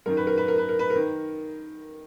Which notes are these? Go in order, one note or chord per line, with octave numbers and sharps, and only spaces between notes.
F#2 D#3 A#4
B4
A#4
B4
A#4
B4
A#4
B4
A#4
D#3